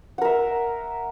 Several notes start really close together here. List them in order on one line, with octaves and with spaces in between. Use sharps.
F#5 A#4 E5